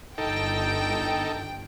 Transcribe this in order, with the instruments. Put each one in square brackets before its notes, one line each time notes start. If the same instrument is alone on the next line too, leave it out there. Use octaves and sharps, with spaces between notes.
[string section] G1 G5 [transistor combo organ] D#4 A4